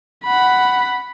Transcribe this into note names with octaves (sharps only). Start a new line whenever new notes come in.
F#5 B5